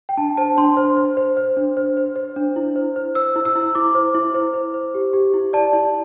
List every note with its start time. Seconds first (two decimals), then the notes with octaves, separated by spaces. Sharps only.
0.09 G5
0.17 D4 A5
0.37 C5 A5
0.58 D4 C6
0.77 C5
0.97 C5
1.17 C5
1.37 C5
1.57 D4
1.77 C5
1.97 C5
2.16 C5
2.36 D4
2.56 E4
2.76 C5
2.96 C5
3.15 C5 E6
3.36 E4
3.45 E6
3.56 E4
3.75 E4 D6
3.95 C5
4.15 E4
4.34 C5
4.54 C5
4.74 C5
4.95 G4
5.13 G4
5.34 E4
5.53 D5 A5
5.73 E4